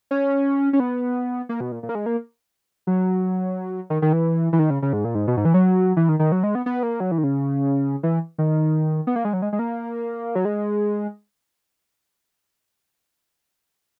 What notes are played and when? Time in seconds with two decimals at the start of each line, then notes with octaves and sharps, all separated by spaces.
0.11 C#4
0.73 C#4
0.80 B3
1.49 A#3
1.60 B2
1.72 A#2
1.83 A#2
1.89 A#3
1.95 G#3
2.06 A#3
2.87 F#3
3.90 D#3
4.02 D#3
4.13 E3
4.53 E3
4.59 D#3
4.70 C#3
4.82 C#3
4.93 G#2
5.05 A#2
5.15 G#2
5.28 B2
5.37 G#2
5.45 E3
5.54 F#3
5.97 E3
6.09 D#3
6.19 D#3
6.32 F#3
6.43 G#3
6.55 B3
6.66 B3
6.83 A#3
7.00 F#3
7.11 E3
7.18 D#3
7.24 C#3
8.03 E3
8.38 D#3
9.07 B3
9.16 A#3
9.25 G#3
9.33 F#3
9.42 G#3
9.53 G#3
9.59 A#3
10.35 F#3
10.45 G#3